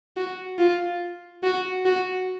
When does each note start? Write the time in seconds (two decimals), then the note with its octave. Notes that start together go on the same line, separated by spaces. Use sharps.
0.17 F#4
0.59 F4
1.43 F#4
1.86 F#4